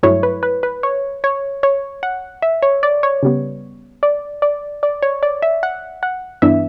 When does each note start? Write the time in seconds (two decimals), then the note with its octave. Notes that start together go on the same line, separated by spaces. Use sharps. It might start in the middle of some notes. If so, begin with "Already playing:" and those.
0.03 G2 F#3 A3 E4 C#5
0.23 B4
0.43 B4
0.63 B4
0.83 C#5
1.24 C#5
1.63 C#5
2.03 F#5
2.42 E5
2.63 C#5
2.83 D5
3.03 C#5
3.23 C#3 G3 B3
4.03 D5
4.42 D5
4.83 D5
5.03 C#5
5.23 D5
5.42 E5
5.63 F#5
6.03 F#5
6.42 G2 E3 B3 D4 E5